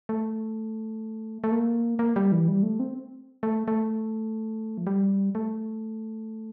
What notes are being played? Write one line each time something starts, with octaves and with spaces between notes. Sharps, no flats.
A3
A3
A#3
A#3
G3
E3
G3
A3
C4
A3
A3
F3
G3
A3